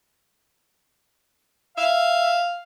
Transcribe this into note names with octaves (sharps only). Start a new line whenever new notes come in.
E5 F5